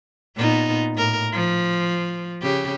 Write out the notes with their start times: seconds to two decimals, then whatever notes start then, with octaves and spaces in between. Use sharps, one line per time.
0.37 A#2 B3 D#4
0.96 A2 A#4
1.33 F3
2.42 C#3 G4